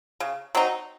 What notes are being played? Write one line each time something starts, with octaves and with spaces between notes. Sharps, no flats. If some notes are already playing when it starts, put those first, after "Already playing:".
C#3
F#3 C4 D#4